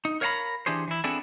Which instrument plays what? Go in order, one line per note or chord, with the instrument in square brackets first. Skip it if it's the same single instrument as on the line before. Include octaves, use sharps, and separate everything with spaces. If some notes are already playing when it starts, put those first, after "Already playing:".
[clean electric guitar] D#4
A#4 C#5 F5 F#5 A#5 B5
E3 D4 G4 G#4 C5
E3 E4
B3 C4 D4 E4 G#4 A4